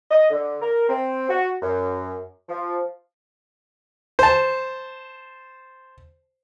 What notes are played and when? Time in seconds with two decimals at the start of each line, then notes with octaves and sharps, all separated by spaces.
0.11 D#5
0.30 D3
0.62 A#4
0.89 C4
1.29 F#4
1.61 F#2
2.49 F3
4.19 C5 A5